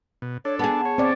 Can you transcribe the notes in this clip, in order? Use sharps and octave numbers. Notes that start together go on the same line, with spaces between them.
B2
D4 A4 C#5
B3 G#4 A5
C#5
C4 D5